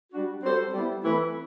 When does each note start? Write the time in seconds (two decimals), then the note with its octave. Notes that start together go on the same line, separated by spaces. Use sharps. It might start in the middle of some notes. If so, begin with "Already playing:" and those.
0.11 G3 D4 F#4
0.42 G3 C4 F#4 A4 C5
0.73 G3 B3 E4
1.03 E3 A3 C4 E4 B4